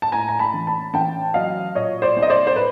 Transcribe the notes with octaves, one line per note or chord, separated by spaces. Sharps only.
A5
A2 G#5 A#5
A#5
A5 B5
A1
A5 B5
A1 G5 A5
F#3 D#5 F5
A#2 C#5 D#5
C5 D5
C2
D#5
C5 D5
C5
B4